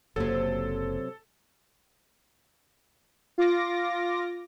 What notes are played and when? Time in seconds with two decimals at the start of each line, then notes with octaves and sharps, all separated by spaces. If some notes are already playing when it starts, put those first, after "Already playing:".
0.16 F#1 C3 F#3 A#3 A4
3.38 F4 D6 A#6